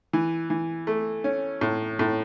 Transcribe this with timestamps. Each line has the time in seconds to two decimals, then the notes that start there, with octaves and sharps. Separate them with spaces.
0.13 E3
0.50 E3
0.87 A3
1.24 C#4
1.61 A2
1.99 A2